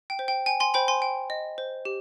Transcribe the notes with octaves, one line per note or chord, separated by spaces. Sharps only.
G5
C5
G5
G5 G#5
G#5 C6
C5 G5 B5
G#5 C6
G5
D#5
C5
G4